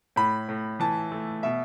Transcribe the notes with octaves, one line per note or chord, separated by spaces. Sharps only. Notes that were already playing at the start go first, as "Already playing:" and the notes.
A2 B5
A2
E3 A5
A3
B2 E5